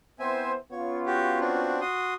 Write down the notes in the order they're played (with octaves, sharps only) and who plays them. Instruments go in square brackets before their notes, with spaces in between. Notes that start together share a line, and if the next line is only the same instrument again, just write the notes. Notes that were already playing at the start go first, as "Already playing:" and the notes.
[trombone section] B3 E4 C5 [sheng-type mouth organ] C4 E5 G#5
[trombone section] B3 C#4 F4 [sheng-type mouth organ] C#5
[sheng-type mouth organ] F#4 G4
C4 D4 F#4
F#4 C6 D#6